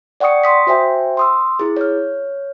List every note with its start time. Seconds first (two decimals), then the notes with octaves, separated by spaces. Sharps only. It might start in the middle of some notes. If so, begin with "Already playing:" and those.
0.20 D5 F#5 G5 C#6 D#6 C#7
0.44 C6 D#6 B6
0.67 F#4 C5 E5 G5 G#5
1.17 C6 D#6 E6
1.59 E4 G#4
1.77 C#5 F6